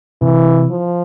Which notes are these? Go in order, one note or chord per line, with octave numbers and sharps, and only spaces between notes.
C3 E3
F3